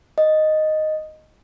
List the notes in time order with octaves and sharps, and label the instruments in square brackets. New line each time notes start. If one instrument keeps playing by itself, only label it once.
[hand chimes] D#5